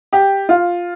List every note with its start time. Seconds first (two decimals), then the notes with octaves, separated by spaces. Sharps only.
0.13 G4
0.49 F4